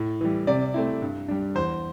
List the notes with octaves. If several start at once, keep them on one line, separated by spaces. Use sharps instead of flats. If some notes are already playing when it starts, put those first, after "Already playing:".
Already playing: A2
E3 G3
C3 D5
A3 C4 E4
G2
G3 D4
E2 C5